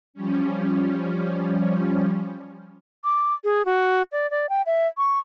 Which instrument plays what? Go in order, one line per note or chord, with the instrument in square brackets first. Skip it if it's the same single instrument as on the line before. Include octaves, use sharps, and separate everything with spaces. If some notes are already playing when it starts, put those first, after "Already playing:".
[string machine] F3 G3 C#4
[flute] D6
G#4
F#4
D5
D5
G5
E5
C#6